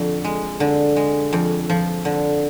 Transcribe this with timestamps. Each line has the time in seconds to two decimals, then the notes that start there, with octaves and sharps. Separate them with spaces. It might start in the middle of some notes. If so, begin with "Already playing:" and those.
Already playing: F2 D3
0.24 G#3
0.60 D3
0.96 G#3
1.33 F2
1.70 F3
2.05 D3